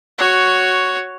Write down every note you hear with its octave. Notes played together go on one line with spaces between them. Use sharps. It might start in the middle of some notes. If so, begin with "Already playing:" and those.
F#4 C#5